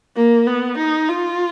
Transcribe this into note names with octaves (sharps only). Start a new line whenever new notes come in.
A#3
B3
D#4
F4